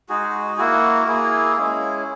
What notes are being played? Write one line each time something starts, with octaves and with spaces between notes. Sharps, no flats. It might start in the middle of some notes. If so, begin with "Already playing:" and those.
G#3 D#4 F#4 G#4
A#3 E4 F#4
A#4
A#3 E4 G#4
G#3 C#4 E4 G#4